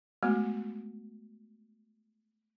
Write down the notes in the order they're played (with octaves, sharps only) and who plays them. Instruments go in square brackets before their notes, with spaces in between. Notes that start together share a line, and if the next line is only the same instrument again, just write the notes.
[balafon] G#3 A3 B3 F#4